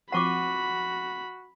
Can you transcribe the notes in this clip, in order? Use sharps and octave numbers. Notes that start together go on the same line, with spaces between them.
F3 C4 F#4 F#5 B5 C#6 D6 D#7